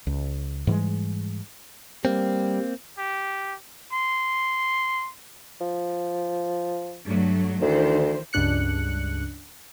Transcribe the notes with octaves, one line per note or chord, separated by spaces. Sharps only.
C#2
G#2 E3 G3 G#3
G3 A#3 C4
G4
C6
F3
G2 F#3 A3
D2 D#3 E3 C5
C#2 G2 D4 F#6 C#7